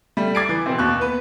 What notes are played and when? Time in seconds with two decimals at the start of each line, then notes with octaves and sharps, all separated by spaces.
0.17 G3 A3
0.35 D6 G#6 A6 C7 D7
0.49 E3
0.66 B2 C4
0.78 D#2 C#6 F#6
0.99 B3 B4